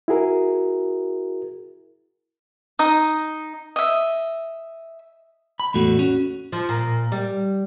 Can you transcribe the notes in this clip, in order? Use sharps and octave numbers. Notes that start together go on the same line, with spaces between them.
E4 F#4 G#4 A#4
D#4 D#6
D#5 E5
B5
E2 A2 A3 F#4
C#4 F#4
F3
A#2
G3